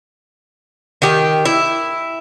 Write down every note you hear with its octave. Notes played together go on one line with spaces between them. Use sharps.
D#3 G4
E4